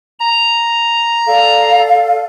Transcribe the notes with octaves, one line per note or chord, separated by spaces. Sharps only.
A#5
A4 D5 F5